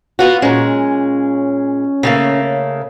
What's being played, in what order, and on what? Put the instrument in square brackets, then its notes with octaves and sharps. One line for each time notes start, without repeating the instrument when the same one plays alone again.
[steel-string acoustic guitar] B3 F4 F#4
[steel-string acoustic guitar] A#2 G#3 [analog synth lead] C#4
[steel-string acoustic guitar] C#3 A3 A#3